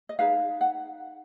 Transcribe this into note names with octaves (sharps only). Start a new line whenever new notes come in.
D#5
D#4 G#4 B4 F5
F#5